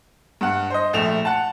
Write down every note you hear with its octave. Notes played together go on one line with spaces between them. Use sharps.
G2 F#5
C5 D#5
A#1 A3 E7 F7
F#5 A5